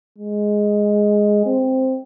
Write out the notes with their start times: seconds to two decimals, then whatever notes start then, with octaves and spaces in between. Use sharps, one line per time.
0.18 G#3
1.46 C4